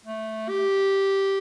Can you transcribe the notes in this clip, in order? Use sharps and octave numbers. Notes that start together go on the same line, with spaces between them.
A3
G4